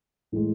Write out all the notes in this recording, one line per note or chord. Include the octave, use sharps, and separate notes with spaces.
A2 E3 G#3